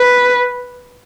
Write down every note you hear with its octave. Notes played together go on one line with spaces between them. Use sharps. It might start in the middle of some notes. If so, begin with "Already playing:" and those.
Already playing: B4